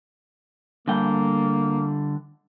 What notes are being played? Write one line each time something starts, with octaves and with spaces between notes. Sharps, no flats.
D3 G3 A#3 G5